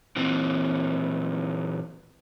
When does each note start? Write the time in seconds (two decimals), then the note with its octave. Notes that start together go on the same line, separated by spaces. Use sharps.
0.16 A#2 E3 C4